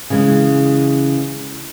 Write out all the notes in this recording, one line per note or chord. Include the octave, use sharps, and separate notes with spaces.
C#3 E3 G#3 B3